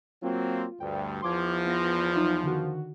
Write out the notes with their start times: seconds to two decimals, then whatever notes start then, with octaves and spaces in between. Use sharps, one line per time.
0.22 F#3 A#3 C4 F4
0.80 D2 G2 G5
1.22 E2 F3 C6 D6 G#6
1.66 B3 F4 A#6
2.15 F#3 D#4 F4
2.43 D3 D#3 F#4